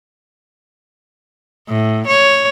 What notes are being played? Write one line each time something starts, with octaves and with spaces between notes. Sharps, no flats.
A2
C#5